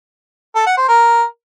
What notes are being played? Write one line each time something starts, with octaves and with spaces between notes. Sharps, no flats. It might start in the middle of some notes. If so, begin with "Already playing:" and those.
A4
F#5
C5
A#4